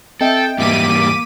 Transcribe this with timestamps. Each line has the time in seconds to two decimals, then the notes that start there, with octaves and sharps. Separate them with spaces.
0.21 C4 A4 D#5 E5 G5
0.59 E2 G#2 G3 A#3 D6 B6 D#7